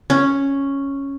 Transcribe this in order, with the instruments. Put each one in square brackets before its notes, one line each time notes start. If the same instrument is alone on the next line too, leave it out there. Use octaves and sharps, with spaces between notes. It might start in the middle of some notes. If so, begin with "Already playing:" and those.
[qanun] C#4